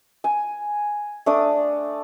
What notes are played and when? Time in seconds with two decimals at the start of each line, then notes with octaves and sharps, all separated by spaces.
0.24 G#5
1.26 A3 D4 D5 D#6